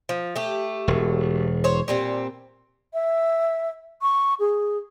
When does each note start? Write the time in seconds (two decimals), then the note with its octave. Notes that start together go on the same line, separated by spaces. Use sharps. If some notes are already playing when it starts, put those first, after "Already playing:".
0.09 F3
0.36 A3 G4
0.88 E1
1.64 C5 C#5
1.88 A#2 G3 C4
2.94 E5
4.02 C#6
4.39 G#4